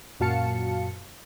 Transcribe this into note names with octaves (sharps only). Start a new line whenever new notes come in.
F#2 A#2 F#4 F5 A5 C#7